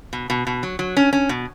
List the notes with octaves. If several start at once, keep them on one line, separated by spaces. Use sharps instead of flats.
B2
B2
B2
F#3
F#3
C#4
C#4
B2